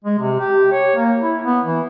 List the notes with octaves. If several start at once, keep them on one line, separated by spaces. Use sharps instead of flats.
G#3
C3
G4
C#5
A#3
E4
B3
E3